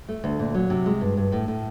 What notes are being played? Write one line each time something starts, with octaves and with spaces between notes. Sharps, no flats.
A3
D2
A#2
F#3
C3
G#3
G2
G2
A2
A2